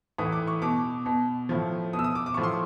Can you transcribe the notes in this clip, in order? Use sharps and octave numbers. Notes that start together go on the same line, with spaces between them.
A2 E3 D#6
D6
C#6
B2 D6
B2
A2 F3
B2 D#6
E6
D#6
D6
D6
A2 F3 C#6
C6